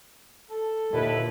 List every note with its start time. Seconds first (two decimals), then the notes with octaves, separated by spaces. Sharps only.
0.50 A4
0.92 D#2 A#2 D3 E4 B4